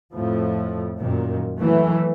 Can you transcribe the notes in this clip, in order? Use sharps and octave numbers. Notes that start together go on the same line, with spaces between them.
F2 A2 F3
F#2 A#2 D#3
E3 F#3 A3